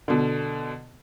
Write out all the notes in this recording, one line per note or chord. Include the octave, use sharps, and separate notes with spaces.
B2 D3